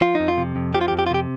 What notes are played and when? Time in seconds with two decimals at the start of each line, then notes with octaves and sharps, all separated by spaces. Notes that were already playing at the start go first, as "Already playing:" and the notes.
0.01 F3 F4
0.15 D#4
0.20 F2
0.28 F4
0.38 C3
0.56 F2
0.74 F3 G4
0.81 F4
0.88 G4
0.92 F2
0.99 G4
1.07 F4
1.10 C3 G4